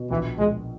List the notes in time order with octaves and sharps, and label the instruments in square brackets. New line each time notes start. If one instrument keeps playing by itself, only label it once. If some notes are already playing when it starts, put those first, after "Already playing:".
Already playing: [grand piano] B2
[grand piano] A#1 [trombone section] E3
[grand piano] A#1 [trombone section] G#3